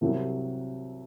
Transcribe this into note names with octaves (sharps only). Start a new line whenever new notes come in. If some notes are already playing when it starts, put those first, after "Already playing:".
C2 C3 F#3 C4